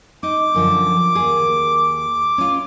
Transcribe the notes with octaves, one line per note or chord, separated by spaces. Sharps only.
D#4 D6
F#2 D3 F3
D#2 G#4
C#4 F4